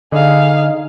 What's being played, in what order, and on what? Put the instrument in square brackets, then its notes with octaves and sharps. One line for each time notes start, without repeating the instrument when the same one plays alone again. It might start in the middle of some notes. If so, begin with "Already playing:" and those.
[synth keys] D3 [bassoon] D#4 [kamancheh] G#4 F5